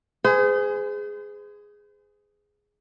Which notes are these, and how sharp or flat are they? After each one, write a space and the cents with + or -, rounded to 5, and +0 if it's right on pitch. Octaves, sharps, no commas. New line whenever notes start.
G#4 +0 C5 -40